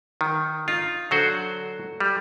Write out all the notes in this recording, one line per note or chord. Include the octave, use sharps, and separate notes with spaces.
D#3
D#4 F4
D3 F#3 F#4 C5
G3